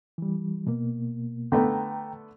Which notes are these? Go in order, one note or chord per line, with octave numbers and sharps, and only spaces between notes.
E3 G3
B2 A#3
D3 A3 B3 G5 A#5